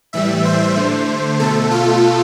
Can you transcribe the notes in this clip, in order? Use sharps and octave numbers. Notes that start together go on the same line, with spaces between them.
A2 E3 G3 E5
C5
D3 A3
B2 A3 A4
F4